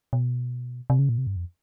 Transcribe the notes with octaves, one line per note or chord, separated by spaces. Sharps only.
B2
C3
C#3
A#2
C3
G2
F2